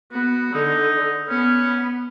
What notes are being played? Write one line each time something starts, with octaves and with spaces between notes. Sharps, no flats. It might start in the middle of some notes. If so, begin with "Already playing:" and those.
B3 F#4
D3 D#4
B3 C#4